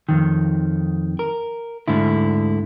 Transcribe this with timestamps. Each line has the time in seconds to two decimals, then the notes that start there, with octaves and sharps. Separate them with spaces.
0.09 F2 D#3
1.19 A#4
1.88 D2 G#2 D3 E4